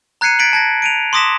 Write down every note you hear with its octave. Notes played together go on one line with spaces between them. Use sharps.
A#5 F#6 G#6 C7 C#7 D#7
G#6 A6 B6 D7 D#7 F#7
A5 G#6 A#6
D7 D#7 F7
C6 D6 D#6 A#6 B6 E7